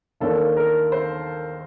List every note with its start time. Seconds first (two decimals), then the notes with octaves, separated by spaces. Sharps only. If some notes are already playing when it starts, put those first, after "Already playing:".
0.20 D#2 D#3 A#3 D4 A4
0.57 A#4
0.92 C5